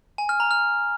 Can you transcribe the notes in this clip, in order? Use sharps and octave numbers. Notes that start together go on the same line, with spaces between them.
G#5
F6
A#5
F6